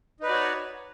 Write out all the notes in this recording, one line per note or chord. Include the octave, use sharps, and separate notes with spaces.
D#4 F#4 B4 C#5 D5